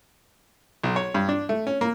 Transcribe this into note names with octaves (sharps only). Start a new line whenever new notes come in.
B1
C#5
G2
D4
A3
C#4
A#3